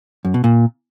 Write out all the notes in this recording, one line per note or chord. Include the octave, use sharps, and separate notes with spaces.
F#2
B2
A#2